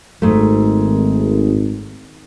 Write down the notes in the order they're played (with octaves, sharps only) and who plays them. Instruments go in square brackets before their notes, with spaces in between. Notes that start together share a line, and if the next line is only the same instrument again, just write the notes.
[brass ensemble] G#1 [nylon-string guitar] G#2 A3